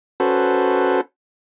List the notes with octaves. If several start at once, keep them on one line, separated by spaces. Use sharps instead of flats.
C#4 F#4 A4 B4 C5